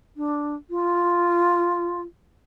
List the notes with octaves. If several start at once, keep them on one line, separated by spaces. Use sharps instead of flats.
D4
F4